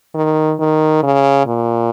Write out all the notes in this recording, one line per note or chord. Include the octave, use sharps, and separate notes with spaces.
D#3
D#3
C#3
A#2